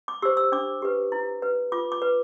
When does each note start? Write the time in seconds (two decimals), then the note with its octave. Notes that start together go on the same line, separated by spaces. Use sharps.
0.08 D6
0.22 G4 C5 E6
0.37 E6
0.52 D4 D6
0.82 G4 B4
1.12 E4
1.42 B4
1.72 F4 D6
1.92 D6
2.02 B4